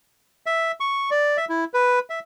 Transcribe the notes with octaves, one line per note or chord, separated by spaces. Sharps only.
E5
C#6
D5
E5
E4
B4
E5